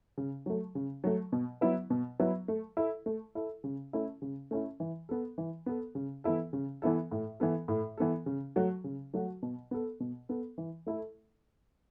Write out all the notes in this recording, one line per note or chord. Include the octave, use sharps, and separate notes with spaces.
C#3
F#3 A3
C#3
F#3 A3
B2
F#3 B3 E4 B4
B2
F#3 B3 E4 B4
A3
E4 A4
A3
E4 A4
C#3
A3 C#4 E4
C#3
A3 C#4 E4
E3
B3 A4
E3
B3 A4
C#3
E3 B3 E4 A4
C#3
E3 B3 E4 A4
A2
E3 B3 A4
A2
E3 B3 A4
C#3
F#3 A3 F#4
C#3
F#3 A3 F#4
B2
B3 A4
B2
B3 A4
E3
A3 E4 A4